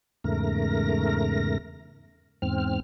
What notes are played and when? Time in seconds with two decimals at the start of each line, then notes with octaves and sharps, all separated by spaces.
0.24 E2 G#2 C#3 A3 A#4 A#6
2.42 E2 G#2 C4 F6